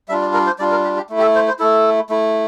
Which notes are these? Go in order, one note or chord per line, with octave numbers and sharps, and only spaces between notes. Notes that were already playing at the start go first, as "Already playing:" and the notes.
G3 D4 F4 E5
D5
A#4
C5
G3 D4 F4 D5
A#4
G4
G4
A3 E4
G4
A4
C5
C5
A3 E4 A4
A3 E4